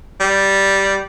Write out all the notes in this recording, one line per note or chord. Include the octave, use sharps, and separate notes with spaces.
G3